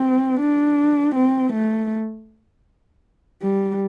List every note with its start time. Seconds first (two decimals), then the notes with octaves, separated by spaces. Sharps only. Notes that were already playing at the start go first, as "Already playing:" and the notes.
Already playing: C4
0.40 D4
1.15 C4
1.53 A3
3.42 G3